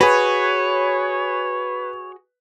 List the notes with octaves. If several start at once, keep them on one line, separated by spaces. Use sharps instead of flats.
F#4 G#4 B4 C#5